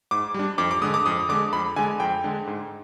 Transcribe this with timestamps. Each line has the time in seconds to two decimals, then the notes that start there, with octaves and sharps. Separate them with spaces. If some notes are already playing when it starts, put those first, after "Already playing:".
0.11 G#2 D6
0.34 G3 D4
0.58 F2 D6
0.71 D6
0.81 D3 G#3 D#6
0.94 D6
1.06 F2 D#6
1.29 D3 G#3 D6
1.53 F2 B5
1.76 D3 G#3 G#5
2.00 F2 G5
2.24 D3 G#3
2.47 G#2